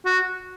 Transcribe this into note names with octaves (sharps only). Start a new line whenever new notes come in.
F#4